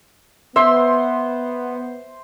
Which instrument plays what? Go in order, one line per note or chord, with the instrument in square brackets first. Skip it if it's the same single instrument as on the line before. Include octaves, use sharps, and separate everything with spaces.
[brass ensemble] B3 [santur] C5 C6 [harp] E5